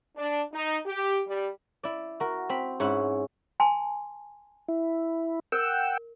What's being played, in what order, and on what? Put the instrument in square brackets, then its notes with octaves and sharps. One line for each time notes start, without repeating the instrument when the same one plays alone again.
[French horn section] D4
D#4
G4
G3
[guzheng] E4 D5
F#4 A#4
C4 B5
G#2 C#4 E4 F#5
[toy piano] G#5 A5 C6
[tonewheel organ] E4
[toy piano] A#4 [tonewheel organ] F#5 G5 E6